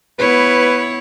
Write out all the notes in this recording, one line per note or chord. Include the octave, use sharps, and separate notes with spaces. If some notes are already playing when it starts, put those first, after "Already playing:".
B3 E4 B4 C#5